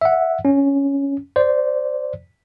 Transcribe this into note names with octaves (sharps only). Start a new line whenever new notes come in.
E5 F#5
C#4
C5 D5